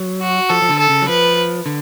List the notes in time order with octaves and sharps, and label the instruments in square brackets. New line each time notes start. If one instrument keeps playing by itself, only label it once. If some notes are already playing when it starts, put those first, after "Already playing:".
Already playing: [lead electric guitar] F#3
[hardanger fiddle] F#4
[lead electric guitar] F3 [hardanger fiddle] A4
[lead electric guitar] F3
D3
[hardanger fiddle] A4
[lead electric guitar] C#3
F#3
[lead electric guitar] F3 [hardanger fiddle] B4
[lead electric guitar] D3